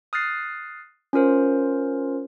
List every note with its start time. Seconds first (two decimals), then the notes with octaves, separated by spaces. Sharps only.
0.13 D#6 F6 F#6 A6 C7
1.13 C#4 F4 A#4 C5